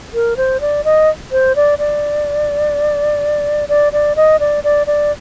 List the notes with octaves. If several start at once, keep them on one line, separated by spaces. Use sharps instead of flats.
A#4
C5
D5
D#5
C5
D5
D5
D5
D5
D#5
D5
D5
D5